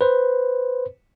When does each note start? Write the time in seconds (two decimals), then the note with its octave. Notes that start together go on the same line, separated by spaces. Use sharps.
0.01 B4 C5